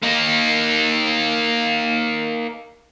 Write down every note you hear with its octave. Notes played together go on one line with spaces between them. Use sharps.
A#3 D#4